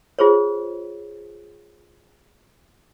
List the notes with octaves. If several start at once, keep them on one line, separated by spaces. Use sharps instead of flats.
F4 G#4 C5 C#5